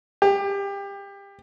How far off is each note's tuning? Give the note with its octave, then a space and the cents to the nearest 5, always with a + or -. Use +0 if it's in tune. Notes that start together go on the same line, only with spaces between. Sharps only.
G4 +25